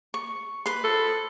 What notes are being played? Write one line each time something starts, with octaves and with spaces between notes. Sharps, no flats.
C#6
B4 C6
A4